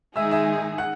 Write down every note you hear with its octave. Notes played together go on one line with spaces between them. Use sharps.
D#3 G#3 D#4 G#4 E5 E6
E5 E6
F#5 F#6